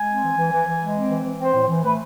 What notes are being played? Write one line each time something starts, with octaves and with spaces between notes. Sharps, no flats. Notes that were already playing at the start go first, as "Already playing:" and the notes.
Already playing: G#3 G#5
C4
E3
E3
E3
E3
G#3
C4
E3
E3
C4 C5
A2
E3
A3 B4